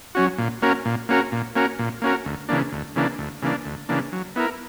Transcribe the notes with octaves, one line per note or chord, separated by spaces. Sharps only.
F#3 C#4 F#4
A#2
A#3 C#4 F#4 A#4
A#2
A#3 C#4 F#4 A#4
A#2
A#3 C#4 F#4 A#4
A#2
A#3 C#4 F#4 A#4
D2
C#3 E3 A#3 D4
D2
C#3 E3 A#3 D4
D2
C#3 E3 A#3 D4
D2
C#3 E3 A#3 D4
F#3
B3 E4 A#4